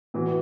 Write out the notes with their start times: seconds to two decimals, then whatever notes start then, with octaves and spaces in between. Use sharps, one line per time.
0.14 A2 E3 B3 F#4